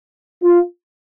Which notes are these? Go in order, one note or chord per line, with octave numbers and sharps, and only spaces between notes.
F4